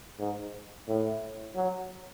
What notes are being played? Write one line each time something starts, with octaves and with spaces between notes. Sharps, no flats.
G#2
A2
F#3